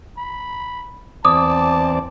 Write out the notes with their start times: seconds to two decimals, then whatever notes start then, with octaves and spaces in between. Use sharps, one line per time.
0.18 B5
1.25 E2 C4 D5 A5 D6 D#6